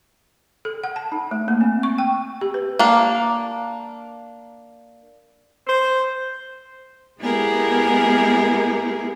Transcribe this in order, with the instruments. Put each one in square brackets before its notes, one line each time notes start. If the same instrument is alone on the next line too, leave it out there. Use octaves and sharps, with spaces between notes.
[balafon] A4
F#5
A5
D#4
A3
A#3
C4
C#6
G5
G4
B4
[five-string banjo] A#3 D4
[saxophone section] C5
[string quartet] G#3 B3 E4 G4 G#4 A#4